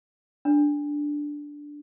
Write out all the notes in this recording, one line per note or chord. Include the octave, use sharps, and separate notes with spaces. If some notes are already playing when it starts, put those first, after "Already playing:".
D4